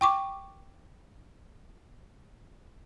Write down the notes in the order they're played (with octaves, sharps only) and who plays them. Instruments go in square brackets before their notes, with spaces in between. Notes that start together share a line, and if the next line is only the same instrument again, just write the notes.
[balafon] G5 C#6 D6